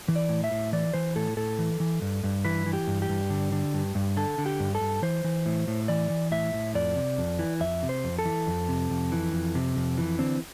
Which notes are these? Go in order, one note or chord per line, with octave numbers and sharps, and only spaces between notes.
E3
D5
A2
E5
A2
E3 D5
E3 C5
A2 A4
A2 A4
E3
E3
G2
G2
E3 B4
E3
G4
G2
G4
G2
D3
D3
G2
G2
D3 A4
D3
G4
G2
A4
G2
E3 C5
E3
A2
A2
E3 D5
E3
A2 E5
A2
F2 D5
C3
F2
E3
F2 E5
C3
C5
F2
A4
E3
F2
C3
F2
E3
F2
C3
F2
E3
D3 C4